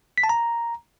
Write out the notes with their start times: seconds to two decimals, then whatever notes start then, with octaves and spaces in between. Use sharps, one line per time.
0.18 B6
0.23 A5
0.29 A#5